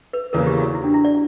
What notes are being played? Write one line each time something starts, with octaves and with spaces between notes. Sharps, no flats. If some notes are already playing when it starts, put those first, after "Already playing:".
B4
E2 C#3 E3 A#3 A#4
G4
F#4
E4
D4
E4
D5